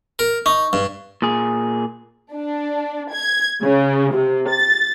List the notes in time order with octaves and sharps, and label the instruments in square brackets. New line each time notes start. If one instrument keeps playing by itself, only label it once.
[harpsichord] A#4
[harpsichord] D#4 [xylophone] C#6
[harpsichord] G2
[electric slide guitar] A#2 G#4
[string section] D4
G#6
C#3
C3
A6